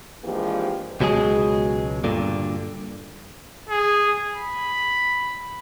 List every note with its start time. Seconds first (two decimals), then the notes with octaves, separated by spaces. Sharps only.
0.24 E3 F3 G#3 A#3 D4 G4
1.00 C#2 B2 F#3 G#3 G#4
2.04 G2 A#2 D3
3.69 G#4
4.36 B5